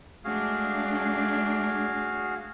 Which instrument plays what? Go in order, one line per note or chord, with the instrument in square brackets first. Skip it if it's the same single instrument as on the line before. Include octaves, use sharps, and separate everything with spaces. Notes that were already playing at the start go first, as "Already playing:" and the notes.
[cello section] G#3 A3 D4 [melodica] F#4 G#4 F5